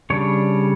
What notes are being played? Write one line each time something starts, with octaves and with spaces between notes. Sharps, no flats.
C#3 G3 D4 C#5